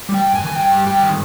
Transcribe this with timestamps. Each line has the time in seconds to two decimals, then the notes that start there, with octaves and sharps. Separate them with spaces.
0.09 G3
0.14 G5
0.24 G2
0.35 G#5
0.40 D#3
0.46 G#5
0.56 G2 G5
0.71 G3
0.87 G2 G5
1.03 D#3